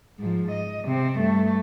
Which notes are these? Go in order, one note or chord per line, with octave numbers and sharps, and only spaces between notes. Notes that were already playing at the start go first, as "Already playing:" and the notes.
G#2 F3
D#5
C3 C4
G2 A3